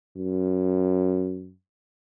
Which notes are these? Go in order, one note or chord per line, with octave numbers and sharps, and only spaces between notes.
F#2